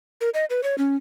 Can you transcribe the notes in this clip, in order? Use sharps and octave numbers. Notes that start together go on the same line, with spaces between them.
A#4
D#5
B4
C#5
C#4